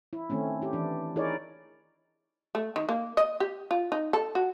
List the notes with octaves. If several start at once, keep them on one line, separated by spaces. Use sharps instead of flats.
E4
D#3 A3 C4 C#4
E4 G4
E3 D4
D#4 E4 G#4 A#4 C#5 D5
A3
D#3
A#3
D#5
G4
F4
D#4
A4
F#4